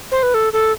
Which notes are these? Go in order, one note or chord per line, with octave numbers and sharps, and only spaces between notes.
C5
B4
A4
A4